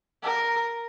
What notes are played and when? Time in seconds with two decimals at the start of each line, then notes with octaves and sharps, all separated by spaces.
0.23 A#4